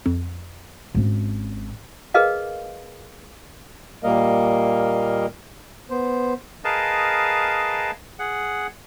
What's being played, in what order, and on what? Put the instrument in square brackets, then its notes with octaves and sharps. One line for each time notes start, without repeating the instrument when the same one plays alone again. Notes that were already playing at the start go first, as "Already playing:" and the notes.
[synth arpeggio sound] F2
[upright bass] G#1 C#4
[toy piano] G#4 A#4 B4 D#5 F5
[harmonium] A#2 G3 A#3 A#4 D#5 F5
B3 C5
[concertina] G#4 A#4 B4 D#5 F5 A5
G#4 F#5